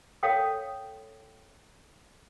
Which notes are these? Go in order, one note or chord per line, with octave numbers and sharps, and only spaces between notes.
A4 C#5 F5 G5 D#6